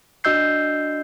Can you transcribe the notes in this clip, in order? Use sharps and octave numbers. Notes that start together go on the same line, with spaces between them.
D4 F#4 D#5 E6 G6 C7